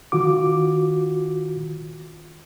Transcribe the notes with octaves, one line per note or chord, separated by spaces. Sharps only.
D#3 F4 F#4 D6